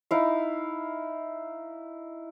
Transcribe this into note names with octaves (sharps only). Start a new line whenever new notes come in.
D#4 E4 F5